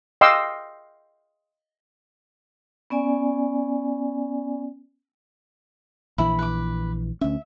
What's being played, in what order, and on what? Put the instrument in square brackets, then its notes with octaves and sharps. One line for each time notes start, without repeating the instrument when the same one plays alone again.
[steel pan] D#5 F5 G5 C6 D6 E6
[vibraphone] B3 C#4 D5 G#5
[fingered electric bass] A#1 E3 [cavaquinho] E4 B5
[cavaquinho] B4 D6
[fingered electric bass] D2 C#4 [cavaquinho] E5